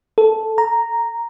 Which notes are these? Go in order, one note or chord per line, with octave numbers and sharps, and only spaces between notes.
A4
A#5